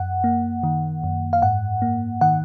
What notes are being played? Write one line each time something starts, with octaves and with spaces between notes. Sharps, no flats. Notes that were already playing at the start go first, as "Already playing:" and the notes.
Already playing: F#2 F#5
A#3
D#3
F#2
F5
G#2 F#5
A#3
D#3 F#5